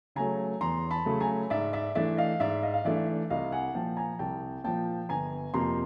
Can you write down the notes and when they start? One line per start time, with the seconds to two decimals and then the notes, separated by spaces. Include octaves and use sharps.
0.16 C#3 F#3 A3 G#5 A#5
0.61 E2 A#5 C6
0.91 A5 B5
1.06 C#3 F#3 A3
1.20 G#5 A#5
1.50 G#2 D5 E5
1.73 D5 E5
1.95 E3 A3 D4 D5 E5
2.17 D#5 F5
2.40 G#2 D5 E5
2.62 D#5 F5
2.74 F5
2.85 E3 A3 D4 D5 E5
3.30 C2 D#5 F5
3.52 F#5 G#5
3.75 A#2 F3 G5 A5
3.97 G#5 A#5
4.19 C2 G5 A5
4.64 A#2 F3 G5 A5
5.09 G1 G#5 A#5
5.54 F2 C3 F3 A#3 A#5 C6